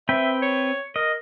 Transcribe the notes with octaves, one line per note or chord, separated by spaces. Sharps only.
C4 B4 E5 G5
C#5
A#4 D#5